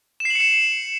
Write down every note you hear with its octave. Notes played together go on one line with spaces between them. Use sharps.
E7
C7
F#7
C#7
E7